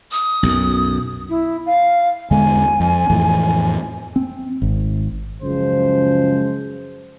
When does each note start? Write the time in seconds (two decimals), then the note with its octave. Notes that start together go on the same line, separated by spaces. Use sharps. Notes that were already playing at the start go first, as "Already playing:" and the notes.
0.12 D#6
0.43 B1 F#2
1.29 E4
1.66 F5
2.31 E2 D3 G#3 G#5
2.80 F2
3.10 F2 A2 E3
4.16 C4
4.62 G#1
5.43 C#2 F#2 F3 G#3 C5